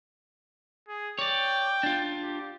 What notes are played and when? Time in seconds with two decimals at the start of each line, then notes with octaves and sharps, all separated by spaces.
0.88 G#4
1.19 C#5 D5 G5
1.83 D4 F4
2.23 G4